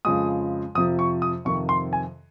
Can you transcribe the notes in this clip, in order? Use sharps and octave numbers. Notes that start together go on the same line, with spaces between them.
F2 C#3 F3 G#3 D#6
F2 C3 F3 D#6
C#6
D#6
F2 C3 D#3 C#6
C6
G#5